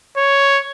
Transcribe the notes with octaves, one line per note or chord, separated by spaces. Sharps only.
C#5